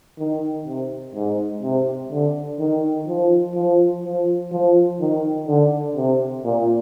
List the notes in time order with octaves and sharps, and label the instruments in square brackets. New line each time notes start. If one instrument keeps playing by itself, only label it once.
[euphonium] D#3
C3
G#2
C3
D3
D#3
F3
F3
F3
F3
D#3
D3
C3
A#2